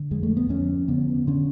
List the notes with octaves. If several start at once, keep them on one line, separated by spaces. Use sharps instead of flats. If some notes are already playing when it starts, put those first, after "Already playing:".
Already playing: D3
F2 G#3
A3
B3
F2 C#4
D3 B3
D3 C#4